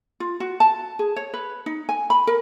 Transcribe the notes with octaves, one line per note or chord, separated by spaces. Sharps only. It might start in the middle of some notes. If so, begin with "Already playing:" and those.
F4
F#4
A5
G#4
C#5
B4
D#4
G#5
B5
A#4